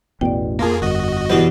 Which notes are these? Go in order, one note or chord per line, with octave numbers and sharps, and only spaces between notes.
A1 E2 B2 D5 G5
F2 A#3 F4 G#4 A#4
G1 F#4 D#5
E2 B2 G4 B4